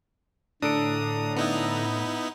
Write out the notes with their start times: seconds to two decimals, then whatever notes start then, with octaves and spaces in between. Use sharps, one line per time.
0.62 A2 D3 D4 A4 A#5 D#6 D7
1.37 B3 D#4 E4